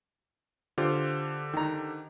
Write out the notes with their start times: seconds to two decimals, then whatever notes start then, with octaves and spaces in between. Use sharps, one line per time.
0.78 D3 F4 G4 C5
1.53 D#3 A#5